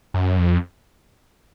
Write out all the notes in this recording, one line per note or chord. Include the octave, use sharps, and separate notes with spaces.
F#2
F2